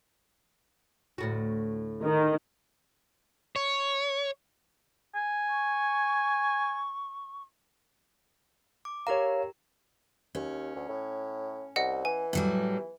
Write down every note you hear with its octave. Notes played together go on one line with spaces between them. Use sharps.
D2 A2 F#4
D#3
C#5
G#5
C#6
D6
G4 A#4 C#5 F5 A#5
D#2 C#4
D2
A2
C2 D#5 F#5
E3 G#5
A2 F#3 G3